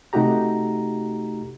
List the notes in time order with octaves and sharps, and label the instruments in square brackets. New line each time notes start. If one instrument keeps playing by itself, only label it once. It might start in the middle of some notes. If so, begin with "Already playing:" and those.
[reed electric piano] C3 A3 D#4 F#4 G4 A#5